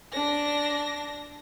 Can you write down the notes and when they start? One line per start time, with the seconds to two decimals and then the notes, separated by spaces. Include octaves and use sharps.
0.13 D4 A#6